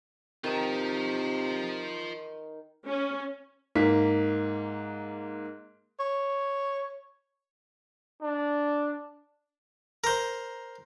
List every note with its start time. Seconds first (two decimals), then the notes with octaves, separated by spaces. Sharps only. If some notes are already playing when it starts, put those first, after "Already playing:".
0.44 C3 D#3 D#4 F4 A5
2.87 C#4
3.75 G#2 A#3 B6
5.99 C#5
8.21 D4
10.04 A#4 C5